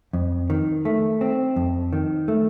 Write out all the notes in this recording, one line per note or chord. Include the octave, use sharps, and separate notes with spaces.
F2
D#3
A3
C4
F2
D#3
A3